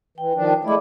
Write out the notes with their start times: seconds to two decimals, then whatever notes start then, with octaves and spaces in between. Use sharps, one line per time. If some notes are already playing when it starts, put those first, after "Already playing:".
0.18 E3 G5
0.34 D#3 F3 D4
0.65 G#3 A3 E4 D5 E5 D6